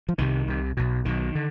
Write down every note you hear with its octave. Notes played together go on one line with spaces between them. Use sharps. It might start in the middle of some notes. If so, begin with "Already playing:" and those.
F3
C2 C3 D#3
C2 C3
B1 B2
B1 B2 D#3
D3